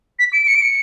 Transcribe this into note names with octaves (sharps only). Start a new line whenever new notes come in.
B6
D7
D7
C#7
D7
C#7